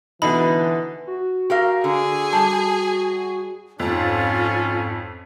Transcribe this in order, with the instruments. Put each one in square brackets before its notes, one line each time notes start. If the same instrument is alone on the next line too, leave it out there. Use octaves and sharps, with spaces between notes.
[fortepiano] B2 D3 D#4 [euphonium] E3 [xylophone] B5
[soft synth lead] F#4
[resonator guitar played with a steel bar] G4 A#4 F5
[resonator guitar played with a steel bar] D3 [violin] G#4
[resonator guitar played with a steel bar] G3 [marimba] A5
[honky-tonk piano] F2 [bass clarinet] G#2 [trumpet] C#4 [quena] F4